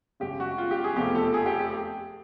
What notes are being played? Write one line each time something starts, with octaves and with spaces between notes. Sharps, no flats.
G#1 F#2 C#3 G4
F#4
F4
G4
G#4
F1 E2 C3 F3 A3 G4
A4
G#4
G4
G4